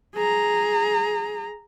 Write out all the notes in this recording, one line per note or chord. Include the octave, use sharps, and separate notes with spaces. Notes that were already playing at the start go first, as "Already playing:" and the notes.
G#4 A#5